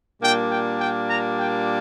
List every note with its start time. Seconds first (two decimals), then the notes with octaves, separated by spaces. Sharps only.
0.22 A#2 G3 A#3 D4 G5
0.51 G5
0.79 G5
1.09 A#5
1.37 G5